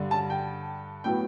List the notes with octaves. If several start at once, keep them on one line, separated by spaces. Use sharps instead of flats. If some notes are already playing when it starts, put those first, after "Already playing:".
Already playing: G2 D3 G3
A5
G5
A2 F#3 B3 G5